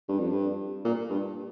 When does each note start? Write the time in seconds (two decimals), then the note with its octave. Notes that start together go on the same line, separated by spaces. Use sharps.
0.09 G2
0.19 F2
0.30 G2
0.85 A#2
1.10 G2